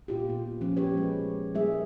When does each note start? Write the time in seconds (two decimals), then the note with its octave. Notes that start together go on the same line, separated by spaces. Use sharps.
0.08 A#2 F4 G4
0.29 B3
0.61 F3 C#4
0.77 C#4 G4 B4 C#5
0.97 G#3
1.55 G3 A#3 G#4 E5